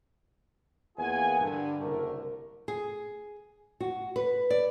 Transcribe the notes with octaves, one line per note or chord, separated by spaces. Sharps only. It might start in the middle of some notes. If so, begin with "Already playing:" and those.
E2 A#3 F4 G#4 F#5 G#5
G2 D3
F#1 C2 D3 A3 A#4
G#4
F#4
B4
D5